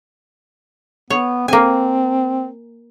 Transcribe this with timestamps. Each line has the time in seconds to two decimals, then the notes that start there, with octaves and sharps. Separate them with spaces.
1.10 B3 C#5
1.48 A#3 C4 G#5